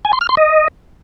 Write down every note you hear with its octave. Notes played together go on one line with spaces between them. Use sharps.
G#5
C6
F6
C6
D#5